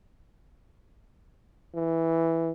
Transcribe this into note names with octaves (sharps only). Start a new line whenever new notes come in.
E3